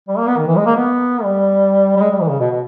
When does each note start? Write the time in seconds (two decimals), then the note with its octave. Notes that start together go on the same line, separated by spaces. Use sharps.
0.08 G3
0.18 A#3
0.27 B3
0.37 D#3
0.47 E3
0.57 G#3
0.66 A#3
0.76 B3
1.24 G3
1.97 G3
2.01 G#3
2.11 G3
2.21 E3
2.30 C#3
2.40 B2
2.51 B2